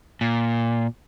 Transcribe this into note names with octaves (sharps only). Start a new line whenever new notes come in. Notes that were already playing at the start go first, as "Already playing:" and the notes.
A#2